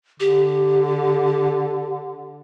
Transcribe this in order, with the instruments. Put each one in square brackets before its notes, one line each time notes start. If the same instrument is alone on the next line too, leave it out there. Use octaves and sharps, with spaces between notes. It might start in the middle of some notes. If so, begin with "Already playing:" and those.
[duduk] D3 [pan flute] G4